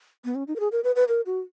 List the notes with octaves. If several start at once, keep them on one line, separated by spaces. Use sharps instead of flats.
B3
C#4
D#4
A#4
G#4
A#4
B4
B4
A#4
F#4